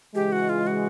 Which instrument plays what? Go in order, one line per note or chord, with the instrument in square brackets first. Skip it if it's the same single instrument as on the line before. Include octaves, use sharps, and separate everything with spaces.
[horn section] C#3 E3 G#3 [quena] G4
[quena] F#4
F4
F#4